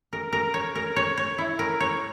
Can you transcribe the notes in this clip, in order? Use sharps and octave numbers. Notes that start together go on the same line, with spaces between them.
A#4
A#4
C#5
A#4
C#5
C#5
E4
A#4
C#5